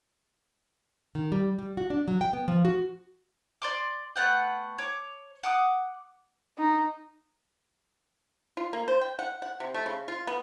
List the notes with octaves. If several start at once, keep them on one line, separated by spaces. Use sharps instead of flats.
D#3
G3
G3
F#4
D4
F#3
G5
B3
F3
F#4
D5 C6 D6
A3 B3 F#5 G5
C#5 D6
F#5 D6 D#6
D#4
F4
A#3
C5
G5
F#5
F#5
C3
A3
C#3
F4
B3